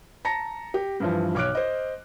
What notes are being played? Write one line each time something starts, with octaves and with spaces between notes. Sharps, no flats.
A5 A#5 A#6 C#7
G4
G2 E3 F3
B1 C#5 D6 F6 F#6 D7
C5 D#5